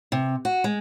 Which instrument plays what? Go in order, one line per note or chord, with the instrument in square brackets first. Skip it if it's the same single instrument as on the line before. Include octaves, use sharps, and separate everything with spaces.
[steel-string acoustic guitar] C3
F#4
G#3